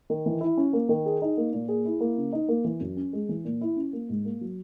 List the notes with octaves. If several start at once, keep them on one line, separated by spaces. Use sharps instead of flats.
D#3
E3
E4
C#4
A#3
D#3
G#4
D#4
A#3
A#2
G#4
E4
A#3
C#3
D#4
A#3
E3
F#2
C#4
G#3
E3
A#2
E4
C#4
A#3
G#2
A#3
F#3